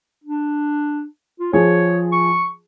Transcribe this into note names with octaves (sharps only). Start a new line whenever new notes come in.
D4
F4
F3 G#4 C#5
C#6